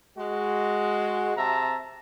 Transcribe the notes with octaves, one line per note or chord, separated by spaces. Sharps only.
G#3 F#4
C3 E5 A5 A#5